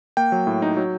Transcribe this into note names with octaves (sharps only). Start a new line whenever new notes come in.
A#3 G5
F#3
A2
D#4
F#3